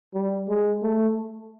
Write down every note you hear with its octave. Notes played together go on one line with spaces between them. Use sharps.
G3
G#3
A3